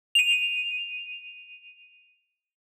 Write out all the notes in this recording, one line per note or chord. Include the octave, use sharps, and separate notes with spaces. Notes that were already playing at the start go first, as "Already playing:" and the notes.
D#7 F7